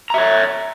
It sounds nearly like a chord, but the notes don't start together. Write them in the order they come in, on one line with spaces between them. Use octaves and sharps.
A#5 E5 C#5